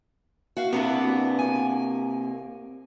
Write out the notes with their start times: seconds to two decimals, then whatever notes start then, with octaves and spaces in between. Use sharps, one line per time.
0.57 F#4 F5
0.73 C3 A#3 B3 D4 E4
1.39 G#5